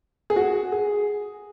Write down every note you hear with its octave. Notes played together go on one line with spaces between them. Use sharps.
G#4
F#4
G#4